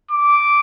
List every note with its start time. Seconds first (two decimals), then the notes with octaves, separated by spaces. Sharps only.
0.11 D6